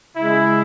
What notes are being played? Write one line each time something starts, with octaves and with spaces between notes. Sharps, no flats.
C#3 G#3 E4